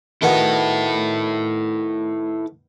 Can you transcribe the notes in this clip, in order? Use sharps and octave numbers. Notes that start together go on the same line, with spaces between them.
D#3 B3 E4 F#4 A4